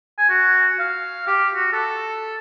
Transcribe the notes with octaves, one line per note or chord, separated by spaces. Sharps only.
G#5
F#4
F5
G4
F#4
A4